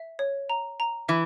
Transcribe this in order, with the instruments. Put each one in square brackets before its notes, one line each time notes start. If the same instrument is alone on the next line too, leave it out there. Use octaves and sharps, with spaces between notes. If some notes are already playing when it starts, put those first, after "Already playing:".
Already playing: [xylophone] E5
C#5
A#5
A#5
[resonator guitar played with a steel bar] E3 [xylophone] E5